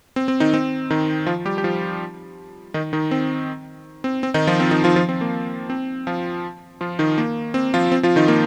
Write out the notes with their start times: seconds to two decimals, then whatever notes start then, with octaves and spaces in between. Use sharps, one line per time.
0.16 C4
0.28 C4
0.40 D#3 D#4
0.54 C4
0.90 D#3 D#4
1.27 F3 F4
1.45 G3 G4
1.58 G4
1.64 F3 F4
2.74 D#3 D#4
2.93 D#3 D#4
3.11 C4
4.04 C4
4.23 C4
4.34 D#3 D#4
4.47 F3 F4
4.60 C4
4.71 D#3 D#4
4.84 F3 F4
4.96 F3 F4
5.09 C4
5.21 A#3
5.70 C4
6.07 F3 F4
6.81 F3 F4
6.99 D#3 D#4
7.18 A#3
7.54 C4
7.74 F3 F4
7.92 C4
8.03 F3 F4
8.16 D#3 D#4
8.28 A#3